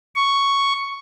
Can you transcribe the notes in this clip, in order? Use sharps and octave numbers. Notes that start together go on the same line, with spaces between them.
C#6